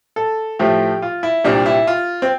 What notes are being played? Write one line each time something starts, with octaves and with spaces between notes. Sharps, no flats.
A4
A2 F3 A3 G4
F4
E4
C2 A#2 G3 D4
E4
F4
C4